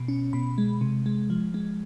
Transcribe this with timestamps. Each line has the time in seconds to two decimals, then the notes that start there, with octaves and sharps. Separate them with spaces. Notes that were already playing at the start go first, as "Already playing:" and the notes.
Already playing: B2
0.08 C#4
0.33 B2 B5
0.58 G#3
0.81 C3
1.06 G#3
1.30 F3
1.54 G#3